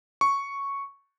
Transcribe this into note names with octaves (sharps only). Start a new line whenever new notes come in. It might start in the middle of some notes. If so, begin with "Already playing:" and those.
C#6